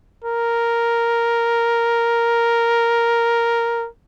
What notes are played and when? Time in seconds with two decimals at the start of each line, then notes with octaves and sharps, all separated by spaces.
0.24 A#4